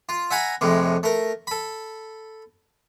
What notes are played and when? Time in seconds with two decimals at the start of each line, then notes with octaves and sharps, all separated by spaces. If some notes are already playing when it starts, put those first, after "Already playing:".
0.09 F4
0.31 E5 F#5 G#5 A#5 B5
0.61 F2 A2 C3 G#3
1.03 A3 A#4
1.47 A4 B5